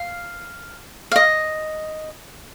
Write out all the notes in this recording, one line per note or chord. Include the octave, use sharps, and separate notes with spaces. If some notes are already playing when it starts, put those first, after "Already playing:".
Already playing: F5
F5
D#5